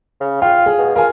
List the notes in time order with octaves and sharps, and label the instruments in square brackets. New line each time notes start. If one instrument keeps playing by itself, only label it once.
[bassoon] C#3
[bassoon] F4 [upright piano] G5
[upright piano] G#4
[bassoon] B2
[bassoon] F4 [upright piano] A#4 G#5